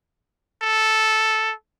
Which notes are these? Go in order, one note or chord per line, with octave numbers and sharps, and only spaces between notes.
A4